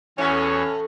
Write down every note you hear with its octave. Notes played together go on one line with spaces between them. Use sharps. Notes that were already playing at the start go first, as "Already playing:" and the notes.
E2 A2 C#4 F#4